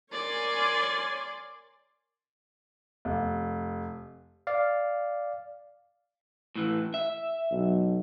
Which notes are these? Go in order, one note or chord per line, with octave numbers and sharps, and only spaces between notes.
A#4 C#5 D5 G#5 C6
F1
D5 F5
A2 E3
E5
B1